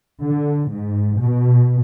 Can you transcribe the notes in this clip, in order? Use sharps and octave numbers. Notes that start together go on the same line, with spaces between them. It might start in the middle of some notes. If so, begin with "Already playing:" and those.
D3
G#2
B2